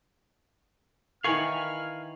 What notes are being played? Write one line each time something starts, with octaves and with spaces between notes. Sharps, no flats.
D#3 E3 A#4 F5 G#5 B5 C#6 F6